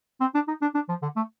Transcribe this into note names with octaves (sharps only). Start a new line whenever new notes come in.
C4
D4
D#4
D4
D4
F3
D3
A3